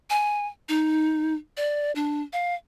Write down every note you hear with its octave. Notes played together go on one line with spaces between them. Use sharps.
G#5
D#4
D5
D4
F5